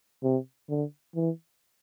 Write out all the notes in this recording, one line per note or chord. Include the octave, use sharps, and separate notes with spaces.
C3
D3
E3